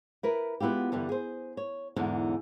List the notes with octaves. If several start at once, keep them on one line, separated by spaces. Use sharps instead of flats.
E4 A#4 B4
G#3 B3 E4 F4 G4
G2 D3 E3 G3
G#4 C5
C#5
E2 G#2 D3 D4 D#4